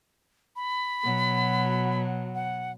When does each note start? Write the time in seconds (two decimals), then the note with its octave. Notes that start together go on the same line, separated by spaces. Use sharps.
0.56 B5
1.03 B2 F#3
2.35 F#5